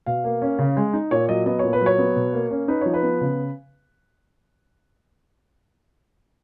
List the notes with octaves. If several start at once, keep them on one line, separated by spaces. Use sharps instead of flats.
B2 F5
A#3
C#4
C#3
G#3
D#4
A#2 C#5
F#3 D#5
B3 D#5
A#2 C#5
B4
F#3
C#5
B3
B2
A#3
C#4
D#4 B4
F3 C#5
B4
B3
C#3